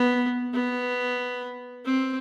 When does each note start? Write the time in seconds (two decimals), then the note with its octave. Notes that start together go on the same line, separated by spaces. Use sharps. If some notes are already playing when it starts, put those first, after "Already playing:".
Already playing: B3
0.54 B3
1.85 C4